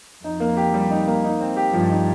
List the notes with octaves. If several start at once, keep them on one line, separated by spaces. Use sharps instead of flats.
F2 D#4
A#3
G4
G3
D#4
A#3
D#4
C4
G4
G2 F3
D#4